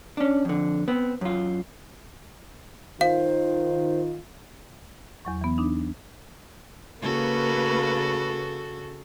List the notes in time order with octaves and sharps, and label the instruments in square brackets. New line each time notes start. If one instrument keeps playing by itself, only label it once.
[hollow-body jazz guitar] C#4 D4
F2 D3
B3 C4
F#2 F4
[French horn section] D#3 F4 [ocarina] C5 [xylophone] F5
[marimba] E2 F#3 C#6
E3 B3
D4 D#4
[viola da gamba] C#3 F#4 A4 [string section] A#3 B4